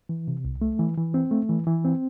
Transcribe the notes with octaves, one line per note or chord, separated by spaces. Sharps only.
E3
C3
C2
A3
E3
E3
C4
A3
E3
E3
C4